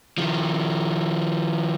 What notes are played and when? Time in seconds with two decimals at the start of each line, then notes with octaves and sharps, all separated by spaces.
0.18 D#3 F3